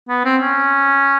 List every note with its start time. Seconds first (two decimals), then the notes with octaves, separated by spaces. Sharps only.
0.08 B3
0.25 C4
0.41 C#4